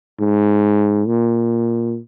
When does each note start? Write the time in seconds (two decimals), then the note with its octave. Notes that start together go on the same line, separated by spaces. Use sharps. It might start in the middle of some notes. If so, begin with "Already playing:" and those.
0.20 G#2
1.07 A#2